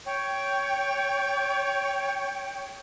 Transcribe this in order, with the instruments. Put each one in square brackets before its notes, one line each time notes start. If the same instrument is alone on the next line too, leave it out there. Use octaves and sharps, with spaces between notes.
[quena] C#5 [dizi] G5